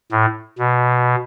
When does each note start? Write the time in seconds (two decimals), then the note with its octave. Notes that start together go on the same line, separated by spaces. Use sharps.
0.12 A2
0.59 B2